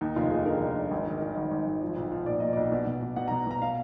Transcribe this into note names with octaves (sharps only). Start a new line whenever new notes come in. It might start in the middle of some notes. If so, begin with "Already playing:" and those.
D#2 D#4
F1 F4
F1 G#4
D3 A#4
F1
F1
G#1
D#3
D#3
G#1
G#1
G#1
F3
B1
F3
A#2 D5
A#2 D#5
B1 D5
B2
B2
B2
B2 F#5
A#5
B2
B2 A#5
F5